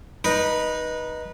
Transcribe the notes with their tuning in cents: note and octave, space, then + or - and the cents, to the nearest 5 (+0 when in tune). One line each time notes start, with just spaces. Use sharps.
D#4 +0 B4 -20